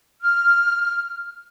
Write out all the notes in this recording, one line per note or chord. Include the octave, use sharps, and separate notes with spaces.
F6